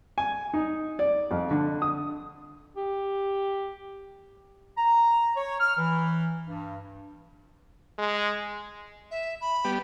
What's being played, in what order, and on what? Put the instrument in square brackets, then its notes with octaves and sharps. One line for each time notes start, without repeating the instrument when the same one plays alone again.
[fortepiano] G#5
D#4
D5
F2
D3
D#6
[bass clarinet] G4
[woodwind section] A#5
C#5
F6
E3
G2
[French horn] G#3
[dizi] E5
B5
[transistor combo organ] G3 B3 G4